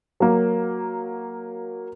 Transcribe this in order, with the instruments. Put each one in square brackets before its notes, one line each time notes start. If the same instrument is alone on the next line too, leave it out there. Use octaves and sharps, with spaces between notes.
[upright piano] F#3 A#3